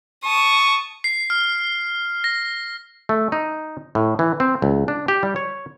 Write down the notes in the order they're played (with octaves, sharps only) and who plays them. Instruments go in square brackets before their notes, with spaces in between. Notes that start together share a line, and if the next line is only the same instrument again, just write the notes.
[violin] A5 D#6 [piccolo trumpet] C#6
[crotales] C7
F6
A#6
[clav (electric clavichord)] A3
D#4
A2
E3
C4
C#2
D4
G4
G3
C#5